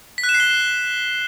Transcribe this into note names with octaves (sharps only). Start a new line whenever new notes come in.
B6
F#6
E7
C7
G7